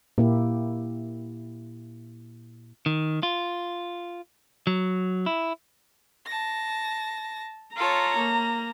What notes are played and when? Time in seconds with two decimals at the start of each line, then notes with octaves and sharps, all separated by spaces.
0.18 A#2 A#3 E4 G4
2.86 D#3
3.23 F4
4.67 F#3
5.26 E4
6.26 A5 A#6
7.76 F4 A4 C#5 A#5
8.16 A#3